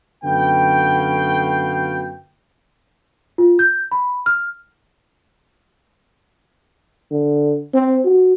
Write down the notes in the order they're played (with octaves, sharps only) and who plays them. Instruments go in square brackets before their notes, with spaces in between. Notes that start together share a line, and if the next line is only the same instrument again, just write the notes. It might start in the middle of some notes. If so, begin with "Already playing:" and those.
[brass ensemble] F#2 D3 B3 F#4 F5 G5
[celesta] F4
G6
B5
F6
[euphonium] D3
C4
F#4